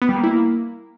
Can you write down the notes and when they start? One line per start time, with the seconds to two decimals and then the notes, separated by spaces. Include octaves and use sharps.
0.02 B3
0.09 G3
0.16 A#3
0.24 E4
0.31 A#3